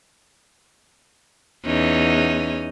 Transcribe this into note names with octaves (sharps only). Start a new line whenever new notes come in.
E2 C#4 D#4